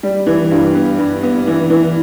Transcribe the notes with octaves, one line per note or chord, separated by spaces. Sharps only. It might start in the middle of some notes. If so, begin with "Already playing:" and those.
G3
E3
G2
B3
G2
B3
E3
E3